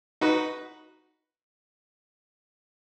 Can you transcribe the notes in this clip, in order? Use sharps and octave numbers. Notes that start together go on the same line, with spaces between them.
D#4 F#4 B4